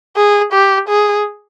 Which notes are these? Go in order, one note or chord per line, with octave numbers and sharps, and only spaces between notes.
G#4
G4
G#4